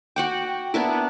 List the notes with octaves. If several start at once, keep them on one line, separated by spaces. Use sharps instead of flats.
F#4 F#5 G5 D6
B3 D4 E4 A#4